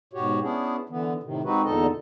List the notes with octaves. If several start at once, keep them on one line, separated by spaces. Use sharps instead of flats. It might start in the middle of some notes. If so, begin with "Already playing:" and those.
G#2 B2 F#4 G4 C#5
B3 C#4 D4 E4 G#4
D3 E3 B3
A2 C3 D#3
G#3 C4 D#4 F#4 B4
E2 A#2 D3 D#4 A4 D#5